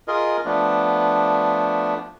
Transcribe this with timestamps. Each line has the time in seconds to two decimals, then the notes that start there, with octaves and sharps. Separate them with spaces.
0.08 F4 G#4 A#4 D#5
0.45 F3 A3 B3 D4